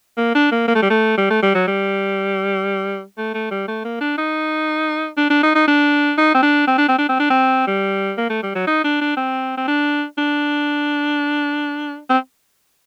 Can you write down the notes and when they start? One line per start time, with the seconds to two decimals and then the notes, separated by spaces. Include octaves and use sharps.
0.18 A#3
0.35 D4
0.52 A#3
0.68 A#3
0.76 A3
0.83 G3
0.90 A3
1.18 G3
1.30 A3
1.43 G3
1.55 F#3
1.68 G3
3.18 A3
3.34 A3
3.51 G3
3.68 A3
3.85 A#3
4.01 D4
4.18 D#4
5.17 D4
5.30 D4
5.43 D#4
5.55 D#4
5.68 D4
6.18 D#4
6.35 C4
6.43 D4
6.67 C4
6.78 D4
6.88 C4
6.99 D4
7.09 C4
7.20 D4
7.30 C4
7.68 G3
8.18 A#3
8.30 A3
8.43 G3
8.55 F#3
8.67 D#4
8.84 D4
9.01 D4
9.17 C4
9.57 C4
9.68 D4
10.18 D4
12.10 C4